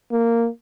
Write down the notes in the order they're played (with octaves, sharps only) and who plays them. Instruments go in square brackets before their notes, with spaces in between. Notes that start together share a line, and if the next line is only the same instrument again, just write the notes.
[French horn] A#3